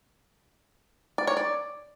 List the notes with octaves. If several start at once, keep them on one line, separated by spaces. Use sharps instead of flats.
D5
C#5
D5